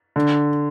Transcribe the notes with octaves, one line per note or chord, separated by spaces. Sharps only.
D3